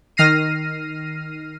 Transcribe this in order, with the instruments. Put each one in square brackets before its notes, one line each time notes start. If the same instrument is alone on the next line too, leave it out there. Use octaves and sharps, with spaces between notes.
[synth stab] D#3 F6 A#6 C7 D#7